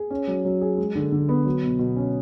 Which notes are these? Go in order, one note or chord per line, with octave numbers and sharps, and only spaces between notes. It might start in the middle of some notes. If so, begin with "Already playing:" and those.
Already playing: G#4
C#4
F#3
F#3
G#4
G#3
D3
D3
B3
F#3
B2
B2
C#4